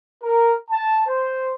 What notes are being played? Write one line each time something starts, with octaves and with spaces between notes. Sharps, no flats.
A#4
A5
C5